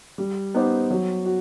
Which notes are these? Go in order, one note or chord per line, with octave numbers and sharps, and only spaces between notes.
G3
B3 D#4 G4 C5
F#3
F#4